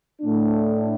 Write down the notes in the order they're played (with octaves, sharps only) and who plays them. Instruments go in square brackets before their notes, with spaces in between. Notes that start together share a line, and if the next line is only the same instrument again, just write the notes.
[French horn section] A2 A3 D4